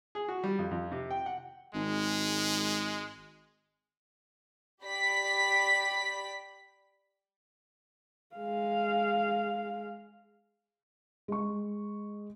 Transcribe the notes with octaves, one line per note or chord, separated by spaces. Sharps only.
G#4
F#4
G3
F2
F2
C3
G5
F#5
G#1 G#3
G4 D5 B5 B6
G#3 F5
G#3 C#6